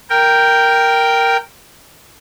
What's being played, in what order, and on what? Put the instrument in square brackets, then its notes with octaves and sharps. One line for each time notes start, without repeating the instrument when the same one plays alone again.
[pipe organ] A#4 G5